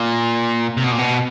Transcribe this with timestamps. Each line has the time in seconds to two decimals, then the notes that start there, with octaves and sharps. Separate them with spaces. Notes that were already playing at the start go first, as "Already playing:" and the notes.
Already playing: A#2
0.77 C3
0.84 B2
0.92 A#2
0.98 B2